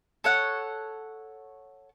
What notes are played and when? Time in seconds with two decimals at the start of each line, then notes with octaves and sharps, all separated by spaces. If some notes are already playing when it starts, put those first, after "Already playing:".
0.24 A4 C#5 F#5